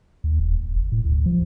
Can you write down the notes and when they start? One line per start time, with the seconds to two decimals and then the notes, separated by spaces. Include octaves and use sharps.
0.24 D#2
0.40 D#1
0.55 D1
0.74 F#1
0.92 A2
1.05 D2
1.26 F3